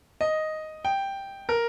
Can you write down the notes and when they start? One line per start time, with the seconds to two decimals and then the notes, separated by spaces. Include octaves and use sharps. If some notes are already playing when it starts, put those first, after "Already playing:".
0.21 D#5
0.85 G5
1.49 A#4